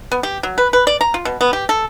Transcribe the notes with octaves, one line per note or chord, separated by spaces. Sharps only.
B3
G4
F#3
B4
B4
D5
A#5
F4
B2
B3
G4
A4